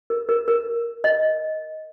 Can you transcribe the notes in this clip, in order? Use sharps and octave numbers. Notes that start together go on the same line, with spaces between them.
A#4
A#4
A#4
D#5